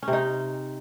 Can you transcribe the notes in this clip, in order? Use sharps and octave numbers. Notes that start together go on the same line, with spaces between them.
C#4
C3
D#4